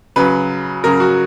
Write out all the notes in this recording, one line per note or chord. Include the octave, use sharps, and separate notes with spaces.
C#3 F#3 B4
C#3 F#3 A#4
F#4